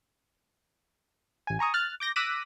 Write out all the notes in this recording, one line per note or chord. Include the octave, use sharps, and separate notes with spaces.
A1 G#5
G#5 A#5 C#6 D#6
F6 F#6 A6
D6 G6 A#6
D6 E6 F#6 A#6 B6 D#7